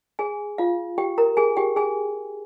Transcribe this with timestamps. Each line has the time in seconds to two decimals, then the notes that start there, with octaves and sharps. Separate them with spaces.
0.19 G#4 G#5
0.58 F4 F5
0.98 G4 G5
1.18 A#4 A#5
1.37 G#4 G#5
1.57 G4 G5
1.76 G#4 G#5